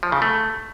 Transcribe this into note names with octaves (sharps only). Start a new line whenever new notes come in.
F3
C#3
A3